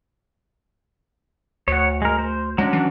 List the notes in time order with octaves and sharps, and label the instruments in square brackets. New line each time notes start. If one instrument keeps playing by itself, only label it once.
[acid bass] D2 [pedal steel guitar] C#5 F#5
[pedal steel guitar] G#3 A#4
C5
[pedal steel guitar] F#3 C#4 D4 [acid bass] G#3
[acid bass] E3